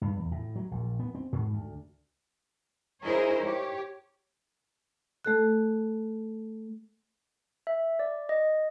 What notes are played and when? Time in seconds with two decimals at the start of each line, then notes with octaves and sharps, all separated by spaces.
0.01 G2
0.20 E2
0.32 A2
0.56 F#3
0.71 A#1
1.00 B3
1.15 C4
1.32 G#2
1.53 D2
3.04 D#4 E4 G#4 A#4 C5 C#5
3.42 G4 C#5
5.25 A3 A4 F#6
7.67 E5
7.99 D5
8.29 D#5